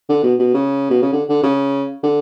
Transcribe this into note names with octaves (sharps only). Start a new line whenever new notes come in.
D3
B2
B2
C#3
B2
C#3
D3
D3
C#3
D3